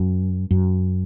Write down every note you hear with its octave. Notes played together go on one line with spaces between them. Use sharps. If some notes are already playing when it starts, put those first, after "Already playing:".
Already playing: F#2
F#2